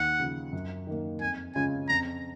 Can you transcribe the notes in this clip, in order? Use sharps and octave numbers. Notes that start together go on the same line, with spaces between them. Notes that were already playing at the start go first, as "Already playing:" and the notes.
Already playing: D#2 F#5
C#3 F3
F#2
D#3 A#3
F2 G#5
C#3 G#3 C#4 F4 G#5
F2 A#5